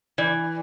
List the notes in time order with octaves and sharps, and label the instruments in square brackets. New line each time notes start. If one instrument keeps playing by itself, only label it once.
[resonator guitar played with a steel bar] E3 [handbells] D5